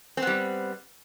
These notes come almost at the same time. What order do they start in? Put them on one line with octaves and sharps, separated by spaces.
C4 B3 G3